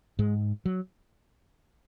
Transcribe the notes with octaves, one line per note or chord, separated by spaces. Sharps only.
G#2 G#3
F#3